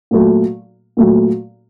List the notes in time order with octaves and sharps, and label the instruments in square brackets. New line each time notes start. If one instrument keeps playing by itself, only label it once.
[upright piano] A#2 F#3 A3
A#2 F#3 A3